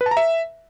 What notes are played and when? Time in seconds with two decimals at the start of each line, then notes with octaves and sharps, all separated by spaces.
0.01 B4
0.06 A5
0.11 A#5
0.17 E5